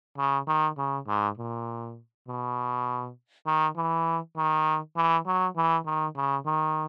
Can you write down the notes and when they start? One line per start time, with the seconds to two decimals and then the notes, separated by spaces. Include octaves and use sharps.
0.18 C#3
0.47 D#3
0.78 C#3
1.07 G#2
1.37 A#2
2.27 B2
3.47 D#3
3.77 E3
4.37 D#3
4.96 E3
5.26 F#3
5.56 E3
5.86 D#3
6.16 C#3
6.46 D#3